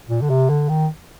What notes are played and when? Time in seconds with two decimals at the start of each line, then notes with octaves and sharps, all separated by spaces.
0.09 A#2
0.22 D3
0.30 C3
0.50 D3
0.69 D#3